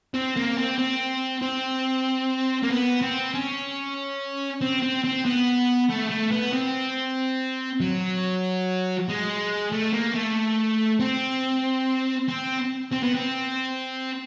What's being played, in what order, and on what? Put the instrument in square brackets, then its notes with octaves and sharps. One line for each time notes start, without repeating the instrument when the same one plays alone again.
[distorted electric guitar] C4
A#3
C4
C4
C4
A#3
B3
C4
C#4
C4
C4
C4
B3
A3
A3
B3
C4
F#3
G#3
A3
A#3
A3
C4
C4
C4
B3
C4